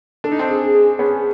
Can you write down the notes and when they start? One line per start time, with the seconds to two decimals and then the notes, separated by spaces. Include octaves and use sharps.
0.24 D4 A4
0.32 D#4
0.39 C4 D4
0.49 G#4
0.74 G#4
0.99 B3 C#4 G#4